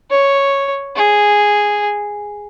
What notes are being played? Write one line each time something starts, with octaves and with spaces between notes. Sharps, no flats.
C#5
G#4